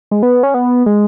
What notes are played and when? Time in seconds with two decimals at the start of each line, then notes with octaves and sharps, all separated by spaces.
0.11 G#3
0.23 B3
0.43 C#4
0.54 B3
0.86 G#3